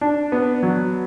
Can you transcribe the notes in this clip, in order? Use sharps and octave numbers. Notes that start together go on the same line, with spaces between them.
D4
B3
F#3